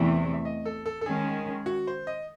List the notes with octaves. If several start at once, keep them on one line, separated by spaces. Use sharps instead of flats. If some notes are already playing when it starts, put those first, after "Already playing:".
Already playing: E2 C3 E3 A3 E5
E5
D#5
A4
A4
A4
D#3 G#3 C#4 G#4
F#4
C5
D#5